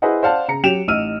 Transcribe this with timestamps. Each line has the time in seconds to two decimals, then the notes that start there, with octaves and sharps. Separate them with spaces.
0.02 E4 G#4 B4 C5 D#5 F#5
0.23 C5 D5 F5 F#5 A5
0.48 C#3 A#5 C#7
0.63 F#3 G4 G5 D7 E7 F7
0.88 A1 D#4 E6 F6 D#7